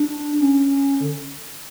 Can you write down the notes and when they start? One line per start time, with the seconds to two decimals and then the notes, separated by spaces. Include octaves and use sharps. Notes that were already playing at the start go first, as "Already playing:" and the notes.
Already playing: D4
0.40 C#4
1.01 D3